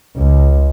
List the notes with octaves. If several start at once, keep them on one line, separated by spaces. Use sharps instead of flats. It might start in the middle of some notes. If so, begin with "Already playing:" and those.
C#2